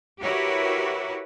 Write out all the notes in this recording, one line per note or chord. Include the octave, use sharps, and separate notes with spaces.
E4 F#4 G4 A#4 B4 C#5